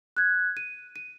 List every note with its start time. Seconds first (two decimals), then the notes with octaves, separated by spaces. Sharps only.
0.17 F#6 G#6
0.57 D#7
0.96 D#7